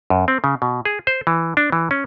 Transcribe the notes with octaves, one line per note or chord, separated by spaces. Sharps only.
F#2
C4
C#3
B2
G#4
C5
E3
D4
E3
C#4